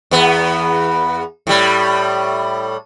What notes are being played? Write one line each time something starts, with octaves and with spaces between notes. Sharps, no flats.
E2 B3
A2 G3